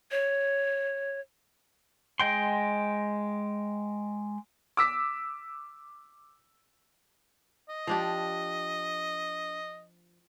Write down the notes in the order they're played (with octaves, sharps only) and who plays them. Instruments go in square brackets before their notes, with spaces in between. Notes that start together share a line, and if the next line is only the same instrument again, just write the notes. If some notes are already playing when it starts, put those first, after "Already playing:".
[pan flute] C#5
[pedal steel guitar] G#3 D#5 G5 C6
[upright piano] D6 E6 B6
[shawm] D#5
[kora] F3 D4 G4